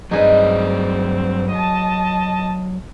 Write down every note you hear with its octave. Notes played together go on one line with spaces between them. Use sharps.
G2 F#3 C4 D#4 G#4 B4 D5
D#5 A5